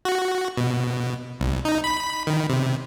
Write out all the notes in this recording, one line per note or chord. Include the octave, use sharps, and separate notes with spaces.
F#4
B2
C2
D#4
B5
D#3
C3